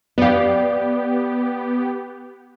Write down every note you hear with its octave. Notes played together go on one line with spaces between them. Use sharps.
B3 G4 D5 F5